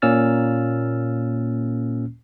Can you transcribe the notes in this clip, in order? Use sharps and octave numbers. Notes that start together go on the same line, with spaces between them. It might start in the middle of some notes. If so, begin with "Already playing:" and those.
A#2 A#3 C#4 E6 F6 A6